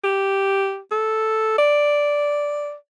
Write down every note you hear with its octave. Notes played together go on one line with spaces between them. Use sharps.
G4
A4
D5